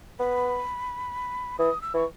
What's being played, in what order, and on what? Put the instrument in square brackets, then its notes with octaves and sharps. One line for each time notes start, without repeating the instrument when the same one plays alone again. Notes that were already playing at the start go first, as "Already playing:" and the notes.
[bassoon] B3 [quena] B5
[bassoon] E3 [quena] D#6
[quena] E6
[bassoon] E3 [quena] C#6